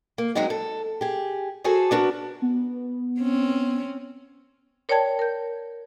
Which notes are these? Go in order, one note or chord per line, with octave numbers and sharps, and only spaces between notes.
A#3
F#3 G#3 C4 D#4 F#4
A4
G4 G#4
F#4 G#4 A4 C5 G#5
B3 D4 F#4 A#4
B3
C4 C#4
A#4 C#5 D5 G5 A5 G#6
A#4 G6